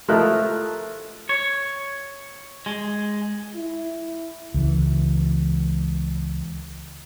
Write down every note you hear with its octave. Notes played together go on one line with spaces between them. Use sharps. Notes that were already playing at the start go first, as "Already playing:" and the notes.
F3 A3 E4 A#4 D#5 F#6
C#5
G#3
E4
C#2 E3